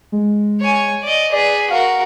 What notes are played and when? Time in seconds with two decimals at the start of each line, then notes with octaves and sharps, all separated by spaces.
0.12 G#3
0.61 C#5 G#5
1.03 D5 D#5
1.32 G#4 B4 D5
1.70 F#4 A#4 F5